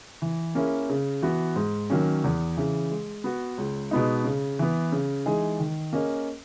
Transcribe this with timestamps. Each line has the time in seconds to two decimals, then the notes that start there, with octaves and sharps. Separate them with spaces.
0.22 E3
0.55 A#3 C#4 E4 G#4
0.89 C#3
1.22 E3 B3 F#4
1.56 G#2
1.90 D#3 F#3 A#3 C#4
2.24 E2
2.57 C#3 E3
2.91 G#3
3.24 B3 F#4
3.58 C#2
3.91 B2 G#3 B3 D#4
4.24 C#3
4.59 E3 B3
4.92 C#3
5.26 E3 G#3 D#4 G#4
5.59 D#3
5.93 A#3 C#4 G#4 D#5